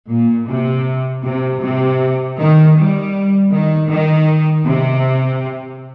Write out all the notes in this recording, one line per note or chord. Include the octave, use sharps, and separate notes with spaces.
A#2
C3
C3
C3
D#3
G3
D#3
D#3
C3